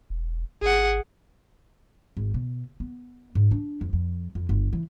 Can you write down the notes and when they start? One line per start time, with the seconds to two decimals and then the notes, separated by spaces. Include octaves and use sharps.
0.10 E1
0.62 G#1 G#4 F#5
2.17 G#1
2.34 B2
2.80 B3
3.35 G#2
3.51 D4
3.81 F2
3.93 F2
4.35 F2
4.49 G1
4.73 E3